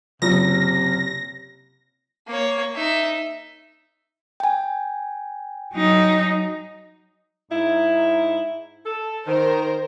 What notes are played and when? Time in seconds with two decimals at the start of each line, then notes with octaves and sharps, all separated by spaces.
0.22 F#1 C3 F4 A#6
2.28 A#3 C#5
2.76 D#4 E5
4.40 G5 G#5
5.73 F#3 D#4
7.50 G#2 D#4 E4
8.85 A4
9.26 D#3 A#4 C5